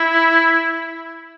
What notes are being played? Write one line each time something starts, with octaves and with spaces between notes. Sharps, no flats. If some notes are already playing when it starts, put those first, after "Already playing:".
Already playing: E4